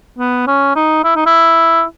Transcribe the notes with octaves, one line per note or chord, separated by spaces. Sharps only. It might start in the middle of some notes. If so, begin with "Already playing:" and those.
B3
C#4
D#4
E4
D#4
E4